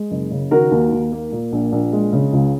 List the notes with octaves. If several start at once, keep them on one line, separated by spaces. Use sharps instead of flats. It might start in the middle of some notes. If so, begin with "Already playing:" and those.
Already playing: G#3
F#1
C#3
D#3 F#4 A#4
D#2
D#2
A#3
A#2
A#1
A#1
G#3
C#3
C#2